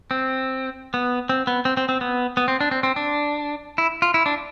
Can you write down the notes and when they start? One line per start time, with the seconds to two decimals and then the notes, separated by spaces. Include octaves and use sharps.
0.11 C4
0.94 B3
1.29 C4
1.47 B3
1.65 C4
1.77 C4
1.89 C4
2.01 B3
2.37 B3
2.48 C4
2.61 D4
2.71 C4
2.83 C4
2.96 D4
3.78 E4
4.02 F4
4.14 E4
4.26 D4